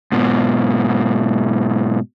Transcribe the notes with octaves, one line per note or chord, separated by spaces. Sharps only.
G#2 B2